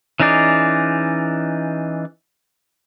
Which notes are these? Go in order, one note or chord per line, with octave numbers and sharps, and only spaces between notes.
E3 C#4 D#4 G#4 D5